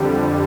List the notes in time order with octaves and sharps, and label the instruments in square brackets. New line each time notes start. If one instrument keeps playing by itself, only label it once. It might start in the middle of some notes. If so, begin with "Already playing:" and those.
Already playing: [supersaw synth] F2 D3 G3